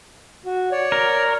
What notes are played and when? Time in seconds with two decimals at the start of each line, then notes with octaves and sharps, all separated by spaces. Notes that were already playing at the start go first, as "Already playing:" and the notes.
0.46 F#4
0.72 C#5 D5
0.92 A#4